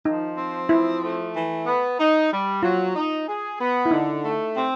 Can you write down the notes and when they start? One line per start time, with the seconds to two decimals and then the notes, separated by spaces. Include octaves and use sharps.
0.05 F3 D#4
0.37 C4
0.69 F3 E4
1.02 A3
1.34 E3
1.66 B3
1.98 D#4
2.31 G3
2.62 F#3 F4
2.94 D#4
3.27 G#4
3.59 B3
3.86 E4
3.91 D3 D#4
4.22 A3
4.55 C4